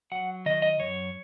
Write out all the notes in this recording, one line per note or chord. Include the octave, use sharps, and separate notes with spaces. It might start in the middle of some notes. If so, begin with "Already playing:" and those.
F#3 F#5
D#3 D#5
D#5
F#2 C#5